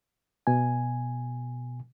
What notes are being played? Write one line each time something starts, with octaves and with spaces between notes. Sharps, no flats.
B2 G#5